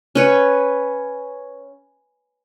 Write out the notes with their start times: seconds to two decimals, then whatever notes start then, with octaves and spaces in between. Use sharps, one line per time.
0.15 C#4 B4 C#5